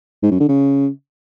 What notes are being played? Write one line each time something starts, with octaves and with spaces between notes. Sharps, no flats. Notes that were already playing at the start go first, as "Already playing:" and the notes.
G#2
F#2
D3
C#3